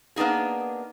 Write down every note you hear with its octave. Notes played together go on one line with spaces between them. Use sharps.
A#3 B3 D4 D#4 G#4